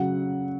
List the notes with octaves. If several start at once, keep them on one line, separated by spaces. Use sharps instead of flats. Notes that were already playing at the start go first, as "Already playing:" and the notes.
Already playing: C#3 F#3 F#5